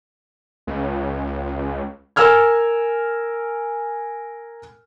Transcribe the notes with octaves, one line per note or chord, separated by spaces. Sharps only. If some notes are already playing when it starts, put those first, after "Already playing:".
C#2
A#4 G#5 E6 F6 G#6